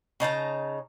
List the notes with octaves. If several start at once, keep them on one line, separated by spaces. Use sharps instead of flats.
C#3 D#4 A5 A#5